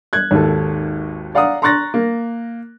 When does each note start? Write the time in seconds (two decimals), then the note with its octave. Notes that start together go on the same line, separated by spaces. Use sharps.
0.13 F#6 G#6
0.31 G#1 D#2 A4
1.35 D5 F5 F#5 A#5 D#6
1.62 A#5 C6 C#6 F#6 A6 A#6
1.94 A#3